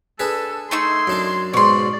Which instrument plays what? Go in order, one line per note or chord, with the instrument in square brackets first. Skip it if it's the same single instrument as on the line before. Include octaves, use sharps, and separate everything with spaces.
[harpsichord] D4 G#4 B4 [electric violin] A4
[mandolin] A3 D#4 E6 [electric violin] C6 G#6
[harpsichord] F#2 D4 D5
[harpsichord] G#2 B2 [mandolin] C#4 C6 [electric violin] D5